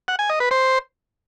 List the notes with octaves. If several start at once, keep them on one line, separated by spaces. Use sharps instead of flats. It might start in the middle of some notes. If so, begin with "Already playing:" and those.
F#5
G#5
D#5
B4
C5